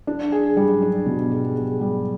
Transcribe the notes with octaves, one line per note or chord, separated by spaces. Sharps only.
D4
G#4
G3
D4
B2
G#4
G#4
G3